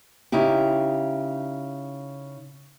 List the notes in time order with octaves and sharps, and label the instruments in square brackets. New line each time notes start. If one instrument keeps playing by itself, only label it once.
[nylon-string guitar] C#3 D#4 E4 G4